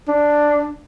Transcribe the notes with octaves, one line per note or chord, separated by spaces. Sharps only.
D4